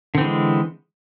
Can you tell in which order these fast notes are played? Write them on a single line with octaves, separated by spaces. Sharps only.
D3 C4 E3 G#3